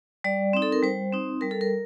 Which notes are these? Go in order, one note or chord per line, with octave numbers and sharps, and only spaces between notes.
G3 D5
C4 D#4
A4
A#4
G3 C5
C4 D#4
G3 A#4
A4
A#4